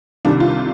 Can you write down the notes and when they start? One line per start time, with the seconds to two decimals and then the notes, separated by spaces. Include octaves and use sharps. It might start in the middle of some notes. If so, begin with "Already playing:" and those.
0.25 C2 C3 D#3 G3 D4
0.40 F4